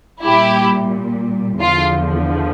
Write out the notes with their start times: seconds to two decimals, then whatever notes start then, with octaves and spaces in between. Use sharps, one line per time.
0.22 A#2 G3 E4 G4
1.60 E2 D3 F3 F4